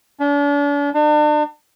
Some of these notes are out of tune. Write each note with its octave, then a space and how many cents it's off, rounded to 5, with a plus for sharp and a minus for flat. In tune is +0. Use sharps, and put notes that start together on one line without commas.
D4 -40
D4 +40